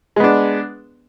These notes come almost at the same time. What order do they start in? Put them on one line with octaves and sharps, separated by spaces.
G#3 B3 D4